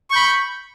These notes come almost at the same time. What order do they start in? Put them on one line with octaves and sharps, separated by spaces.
C#6 G6 B5